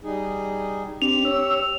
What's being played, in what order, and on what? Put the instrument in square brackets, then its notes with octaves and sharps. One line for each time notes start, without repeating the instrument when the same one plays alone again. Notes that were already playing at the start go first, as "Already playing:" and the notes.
[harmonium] G3 D#4 G#4
[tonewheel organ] C4 D4 [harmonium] G4 [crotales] F7
[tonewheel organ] C#5 E6